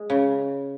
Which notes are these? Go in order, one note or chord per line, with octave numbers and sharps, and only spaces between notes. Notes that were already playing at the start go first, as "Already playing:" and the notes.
Already playing: G#3
C#3